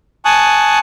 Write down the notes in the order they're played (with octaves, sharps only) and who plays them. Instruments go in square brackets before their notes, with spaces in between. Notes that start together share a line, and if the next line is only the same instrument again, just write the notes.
[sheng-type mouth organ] G#5 A5 C#6 D#6 F#6